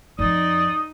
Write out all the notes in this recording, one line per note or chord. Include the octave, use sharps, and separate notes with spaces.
F2 D#4 D5 D#6